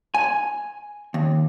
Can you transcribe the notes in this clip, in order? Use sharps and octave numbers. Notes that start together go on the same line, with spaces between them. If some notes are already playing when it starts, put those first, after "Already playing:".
G#5
D#2